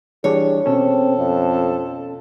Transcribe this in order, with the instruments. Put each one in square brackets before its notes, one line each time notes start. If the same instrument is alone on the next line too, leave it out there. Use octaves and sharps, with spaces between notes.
[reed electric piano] E3 G3 D4 [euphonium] G#4 [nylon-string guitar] C#5
[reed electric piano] B2 C#4 [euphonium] C4 [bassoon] A4
[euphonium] F2